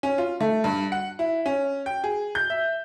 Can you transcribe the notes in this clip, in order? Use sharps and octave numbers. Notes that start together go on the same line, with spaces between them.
C#4
F4
A3
G2
F#5
E4
C#4
G5
G#4
G6
E5